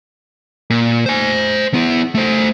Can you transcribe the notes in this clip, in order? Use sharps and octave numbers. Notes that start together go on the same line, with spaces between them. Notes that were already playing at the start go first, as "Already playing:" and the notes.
A#2
C5 G#5
B3 E4
A3 C5